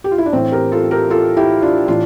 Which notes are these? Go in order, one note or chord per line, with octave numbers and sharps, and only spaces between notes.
G4
F4
E4
D4
A2 E3 C4
G4 A#4
F4 A4
G4 A#4
F4 A4
E4 G4
D4 F4
A2 E3 D4 F4